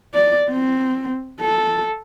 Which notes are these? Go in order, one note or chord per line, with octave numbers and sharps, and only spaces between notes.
D5
C4
A4